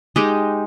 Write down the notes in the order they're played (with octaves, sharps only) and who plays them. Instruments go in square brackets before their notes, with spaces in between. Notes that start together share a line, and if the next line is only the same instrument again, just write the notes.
[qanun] G#3 D#4 G4